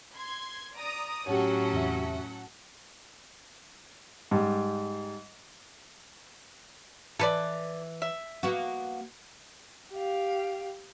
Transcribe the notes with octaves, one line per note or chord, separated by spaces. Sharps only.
C6 G#6
D5 A#5 D#6
A2 F#3 C#4 F#4 G4 A4 C#5 F#5
E2 C3 E5
G#2 G3
E3 A4 B4 D5
E5
A#3 B3 F#4
G4 F5